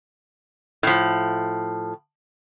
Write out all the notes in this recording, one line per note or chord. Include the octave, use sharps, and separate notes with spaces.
A2 F3